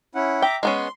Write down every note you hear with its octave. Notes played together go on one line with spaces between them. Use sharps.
C#4 E4 F#5
E5 G5 A#5 D6
G#3 B3 C#4 C6